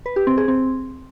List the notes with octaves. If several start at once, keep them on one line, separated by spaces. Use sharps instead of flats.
B4
G4
C4
G#4
C4